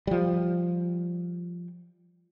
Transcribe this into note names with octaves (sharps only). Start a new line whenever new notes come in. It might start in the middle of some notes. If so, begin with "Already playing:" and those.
F3 G3